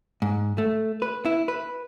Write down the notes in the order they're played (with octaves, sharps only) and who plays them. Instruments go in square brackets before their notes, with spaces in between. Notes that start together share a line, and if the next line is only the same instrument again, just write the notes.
[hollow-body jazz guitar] G#2
A3
B4
E4
B4